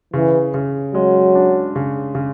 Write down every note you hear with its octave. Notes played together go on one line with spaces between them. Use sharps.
C#3 E3
C#3
F#3 G#3
D4
C#3
C#3